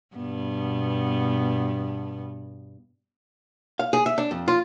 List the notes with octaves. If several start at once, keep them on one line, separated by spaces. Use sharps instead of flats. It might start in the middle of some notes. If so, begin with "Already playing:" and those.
G2 B2 B3
F5
G#4
E5
D4
F2
F4